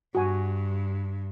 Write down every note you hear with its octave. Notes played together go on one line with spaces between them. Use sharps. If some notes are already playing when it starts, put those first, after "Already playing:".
G2 F#4 G#5